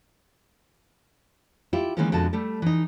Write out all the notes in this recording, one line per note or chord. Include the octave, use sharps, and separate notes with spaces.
E4 F4 G4
D#3 E3 G#3 A#3 B3 C#4
F2 B2 D3 G#3 A5
G3 A3 A4
E3 D#4